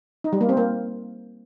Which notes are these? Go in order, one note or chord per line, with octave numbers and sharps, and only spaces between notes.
D#4
G3
A#3
C4
A#3